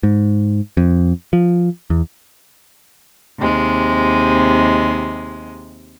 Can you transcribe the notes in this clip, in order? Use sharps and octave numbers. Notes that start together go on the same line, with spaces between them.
G#2
F2
F3
E2
D#2 C3 G#3